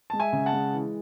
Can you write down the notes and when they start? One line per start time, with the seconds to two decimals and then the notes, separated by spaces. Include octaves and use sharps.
0.10 G#3 A5
0.20 E5 G#5
0.33 C#3
0.46 F#5 A5
0.53 G#3
0.73 E3